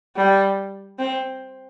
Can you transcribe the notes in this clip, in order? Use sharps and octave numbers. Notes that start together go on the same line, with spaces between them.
G3
C4